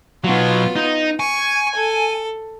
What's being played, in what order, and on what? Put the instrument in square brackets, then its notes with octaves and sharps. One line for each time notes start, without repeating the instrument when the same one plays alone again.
[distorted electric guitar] B2 F#3 [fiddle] B3 F4
[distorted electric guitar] D#4
[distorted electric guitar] G#5 [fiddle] C#6
[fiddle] A4